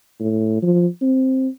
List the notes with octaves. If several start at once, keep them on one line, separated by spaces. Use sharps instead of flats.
A2
F3
C4